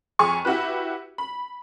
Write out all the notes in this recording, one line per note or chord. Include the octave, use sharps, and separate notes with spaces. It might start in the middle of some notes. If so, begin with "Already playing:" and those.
F2 G#4 G#5 C#6
E4 F#4 G4 B4
B5